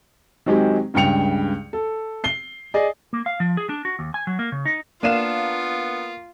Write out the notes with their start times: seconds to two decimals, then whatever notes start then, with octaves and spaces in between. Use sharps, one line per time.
0.46 D#3 F#3 G#3 C4 G4
0.94 C#2 G2 C#3 G5 C#7 F7
1.73 A4
2.24 C7 G7
2.74 G#4 D5 D#5
3.13 A#3
3.26 F5
3.40 F3
3.57 G#4
3.69 D4
3.85 F#4
3.99 D#2
4.14 G#5
4.27 F#3
4.39 A#3
4.52 C#3
4.65 D#4
5.03 A#3 B3 D4 F4 F5 D#7 E7